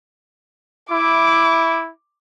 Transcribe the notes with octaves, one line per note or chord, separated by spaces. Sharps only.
E4 D6